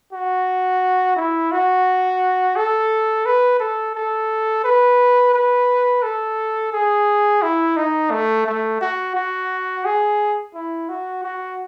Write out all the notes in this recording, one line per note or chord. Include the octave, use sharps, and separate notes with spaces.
F#4
E4
F#4
A4
B4
A4
A4
B4
B4
A4
G#4
E4
D#4
A3
A3
F#4
F#4
G#4
E4
F#4
F#4